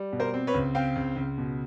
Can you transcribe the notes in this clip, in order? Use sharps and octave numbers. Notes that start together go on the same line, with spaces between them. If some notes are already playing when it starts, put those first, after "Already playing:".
Already playing: G3
B2
A#4 C5
C4
B4 C#5
C#2
C4 F5 G5
C#2
C#2
B2